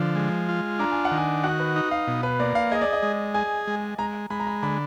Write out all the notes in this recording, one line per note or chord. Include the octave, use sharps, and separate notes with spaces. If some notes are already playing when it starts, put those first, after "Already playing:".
Already playing: D3 F3
G#3
F4
D4 A#5
G#5
F#5
D#3
G#5
F#4 F#5
B4
D#4
F5
B2
B4
A#3 D5
F5
G#4 D#5
D5
D#5
G#3
G#4 G#5
G#3
G#3 A#5
G#3 B5
A#5
B5
D3 B5